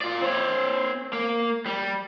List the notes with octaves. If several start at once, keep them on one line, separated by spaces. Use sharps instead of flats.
F4 D5
C4 C#5
A#3
G3